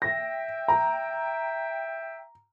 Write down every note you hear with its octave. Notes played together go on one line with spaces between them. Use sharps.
E5 G5 A#6
A#5